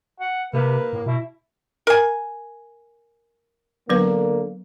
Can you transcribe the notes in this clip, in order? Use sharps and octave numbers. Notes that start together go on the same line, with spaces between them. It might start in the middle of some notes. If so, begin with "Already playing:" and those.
F#5
C3 A#3 B4
A2
B2 E4
A#4 G#5
D3 F#3 A#3 B3 B4